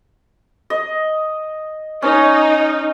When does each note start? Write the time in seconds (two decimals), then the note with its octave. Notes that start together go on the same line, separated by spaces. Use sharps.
0.70 D#5
2.02 C#4 D#4